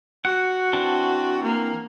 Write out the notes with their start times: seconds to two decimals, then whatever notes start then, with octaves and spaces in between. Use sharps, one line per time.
0.25 F#4 F#5
0.73 E3 C4 D4
1.43 A#3